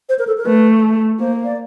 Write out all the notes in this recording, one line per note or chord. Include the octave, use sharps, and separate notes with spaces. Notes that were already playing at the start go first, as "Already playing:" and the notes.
C5
A#4
A4
A#4
A3 B4
A#3 C5
D5